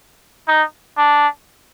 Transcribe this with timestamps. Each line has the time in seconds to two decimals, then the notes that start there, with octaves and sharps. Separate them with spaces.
0.48 D#4
0.98 D4